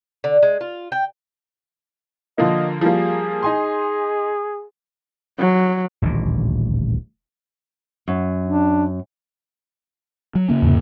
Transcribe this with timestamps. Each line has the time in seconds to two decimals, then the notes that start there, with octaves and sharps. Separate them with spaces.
0.24 D3
0.43 G#3
0.61 F4
0.92 G5
2.38 D3 F3 A#3 D#5
2.81 F3 G3 A#3 G#4
3.43 D#4 G#5 C6
5.38 F#3
6.02 D#1 A1 D2 A#2
8.08 F#2
8.46 D4
10.35 F#3
10.48 C#3 A#3 C#4
10.62 E2 G#2 C3